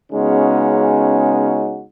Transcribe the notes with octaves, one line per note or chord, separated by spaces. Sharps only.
C#3 G#3 B3 C#4 D#4 F#4